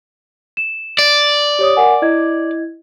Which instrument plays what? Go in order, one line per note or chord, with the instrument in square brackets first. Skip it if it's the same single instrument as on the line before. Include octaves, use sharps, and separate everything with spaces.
[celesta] E7
[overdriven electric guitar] D5
[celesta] G4 C#5 D#6
A#4 F#5 G#5
E4 D#5 G#6